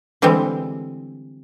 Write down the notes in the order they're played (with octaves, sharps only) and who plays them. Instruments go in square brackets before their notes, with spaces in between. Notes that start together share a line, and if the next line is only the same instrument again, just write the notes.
[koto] D3 E3 G3 G#3 C4